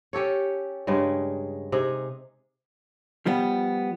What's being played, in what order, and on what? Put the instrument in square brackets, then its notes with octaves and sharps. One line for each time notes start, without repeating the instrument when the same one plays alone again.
[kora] C#4 G4 A4 C#5
G2 C#3 G3 G#3
C3 D#4 G#4
[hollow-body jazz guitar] F3 G3 B3